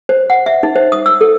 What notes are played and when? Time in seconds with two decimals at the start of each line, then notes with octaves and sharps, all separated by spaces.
0.09 C5
0.30 F#5
0.46 E5
0.63 D#4
0.76 C5
0.92 D#6
1.06 E6
1.21 A4